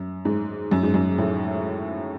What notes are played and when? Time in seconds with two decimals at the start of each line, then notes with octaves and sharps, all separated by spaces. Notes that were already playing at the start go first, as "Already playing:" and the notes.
Already playing: F#2
0.25 G#2
0.71 F#2
0.83 G#2
0.94 F#2
1.18 A2